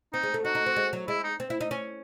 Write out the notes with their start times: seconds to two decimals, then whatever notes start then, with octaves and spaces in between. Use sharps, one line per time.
0.13 C4 D#4
0.23 G#3
0.34 A3
0.45 D#4 F#4
0.55 D#4
0.66 C4
0.76 G#3
0.93 F#3
1.08 G#3 E4
1.24 D#4
1.40 C4
1.50 E4
1.61 D#4
1.71 C#4